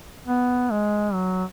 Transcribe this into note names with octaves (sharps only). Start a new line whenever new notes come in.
B3
G#3
F#3